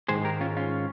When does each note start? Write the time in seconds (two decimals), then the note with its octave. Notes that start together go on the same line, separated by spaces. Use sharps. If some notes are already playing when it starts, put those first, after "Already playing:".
0.08 G#2 D#3 G#3 G#4 C5
0.25 G4 A#4
0.41 C#4 F4
0.57 C#4 F4